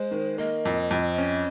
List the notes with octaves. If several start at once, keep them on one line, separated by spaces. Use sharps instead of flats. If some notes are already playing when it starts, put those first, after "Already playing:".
Already playing: G#3 C5
D#3
A#3 D#5
F2
F2
C#4